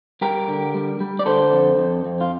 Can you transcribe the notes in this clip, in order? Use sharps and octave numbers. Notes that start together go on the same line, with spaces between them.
G3 G4 A#4
D3
G3
G3
D5
D3 A4 C5
F2
F2
F2
F4